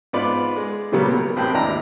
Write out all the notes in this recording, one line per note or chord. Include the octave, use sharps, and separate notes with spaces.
G#2 B3 F4 B4 D5
G#3
A#2 C#3 F#3 G3 A#3 B3
B1 B3 A#4
A1 C4 B4 G5 B5
G#1 D#2 D4 E4 A#5